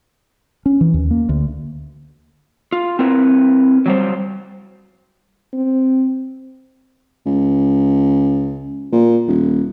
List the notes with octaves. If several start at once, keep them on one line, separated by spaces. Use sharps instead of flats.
C#4
E3
D#2
A#3
D2
F4
C4 E4 A#4 B4
F#3 G3 C5
C4
C#2
A#2
D#1